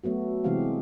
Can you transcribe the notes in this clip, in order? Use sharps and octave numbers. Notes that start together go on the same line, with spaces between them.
F#3 A3 B3 F#4
C3 E3 G#3 C4 G4 F5